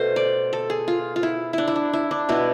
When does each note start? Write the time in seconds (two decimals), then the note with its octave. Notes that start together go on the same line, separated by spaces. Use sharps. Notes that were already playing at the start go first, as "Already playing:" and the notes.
Already playing: B2 A3 A4 C5
0.16 D5
0.53 A4
0.70 G#4
0.88 F4
1.16 F4
1.23 E4
1.53 D4 E4
1.68 E4
1.76 D4
1.93 E4
2.11 D4
2.29 B2 B3 E4